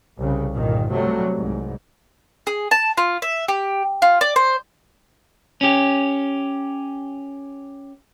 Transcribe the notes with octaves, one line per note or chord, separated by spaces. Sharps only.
C2 C#3
G1 C2 A#2 D#3
C3 F#3 G3 A3
C2 G#2
G#4
A5
F4
E5
G4
F4
D5
C5
C#4 G4